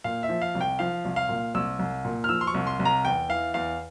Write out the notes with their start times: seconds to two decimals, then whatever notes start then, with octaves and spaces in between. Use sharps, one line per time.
0.04 A#2 F5
0.23 E5
0.29 F3
0.42 F5
0.55 C2
0.61 G5
0.79 F3 F5
1.05 C2
1.16 F5
1.29 A#2
1.54 C2 E6
1.79 C2
2.05 A#2
2.24 F6
2.29 F3 E6
2.41 C6
2.47 C#6
2.54 C2
2.67 C6
2.79 C2
2.85 A#5
3.05 E2 G5
3.29 E3 F5
3.54 E2 F5